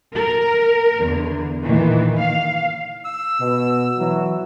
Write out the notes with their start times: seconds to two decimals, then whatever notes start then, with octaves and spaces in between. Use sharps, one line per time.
0.15 A#4
1.01 E2 D3
1.63 A#2 D#3 E3
2.18 F5
3.05 E6
3.40 B2
3.98 E3 F#3